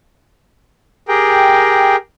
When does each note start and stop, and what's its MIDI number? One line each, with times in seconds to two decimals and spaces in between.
1.08 1.96 67
1.08 1.96 68
1.08 1.96 70
1.08 1.96 79